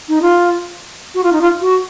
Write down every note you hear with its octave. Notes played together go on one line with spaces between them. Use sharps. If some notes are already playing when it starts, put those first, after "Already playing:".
D#4
F4
F#4
F4
D#4
F4
F#4